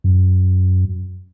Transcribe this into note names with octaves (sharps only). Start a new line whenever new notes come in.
F#2